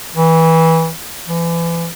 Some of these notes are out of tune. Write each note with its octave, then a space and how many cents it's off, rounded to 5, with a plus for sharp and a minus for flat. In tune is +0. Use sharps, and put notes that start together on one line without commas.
E3 -20
E3 +30